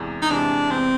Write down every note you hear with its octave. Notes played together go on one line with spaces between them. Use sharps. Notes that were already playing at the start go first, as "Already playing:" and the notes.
Already playing: E2 C3 E3 G#3
D#4
C3 E3 G#3 D4
E2 C4